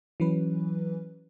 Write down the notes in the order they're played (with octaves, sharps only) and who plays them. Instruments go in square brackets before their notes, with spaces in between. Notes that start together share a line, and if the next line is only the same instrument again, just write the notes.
[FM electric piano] E3 F#3 C#4 B4